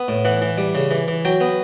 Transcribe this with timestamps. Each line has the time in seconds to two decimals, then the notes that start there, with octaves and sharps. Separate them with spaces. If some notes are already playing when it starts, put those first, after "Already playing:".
Already playing: B3
0.08 A2
0.25 E3 F#5
0.42 E3
0.58 G3
0.75 C#3
0.91 E3
1.08 E3
1.25 F#3 G5
1.41 B3